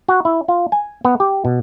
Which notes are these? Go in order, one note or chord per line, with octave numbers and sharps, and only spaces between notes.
F#4
E4
F4
G#5
B3
G4
B2